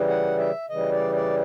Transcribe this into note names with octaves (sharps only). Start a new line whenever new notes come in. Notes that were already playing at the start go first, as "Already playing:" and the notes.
Already playing: C#3 E3 G3
F#5
E5
C#3 E3 G3 D#5
D5
D5